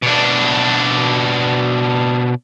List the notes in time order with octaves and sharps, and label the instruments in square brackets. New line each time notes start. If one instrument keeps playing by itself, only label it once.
[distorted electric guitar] B2 D4